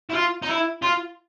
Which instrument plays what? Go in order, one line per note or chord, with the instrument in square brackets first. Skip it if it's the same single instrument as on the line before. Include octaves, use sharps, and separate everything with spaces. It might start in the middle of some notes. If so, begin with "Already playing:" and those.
[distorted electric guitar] E4
F4
D#4
E4
F4